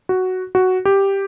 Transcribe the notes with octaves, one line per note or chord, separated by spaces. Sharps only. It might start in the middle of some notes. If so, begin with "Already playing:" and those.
F#4
F#4
G4